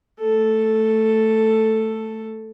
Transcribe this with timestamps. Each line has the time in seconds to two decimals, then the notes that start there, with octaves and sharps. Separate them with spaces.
0.20 A3 A4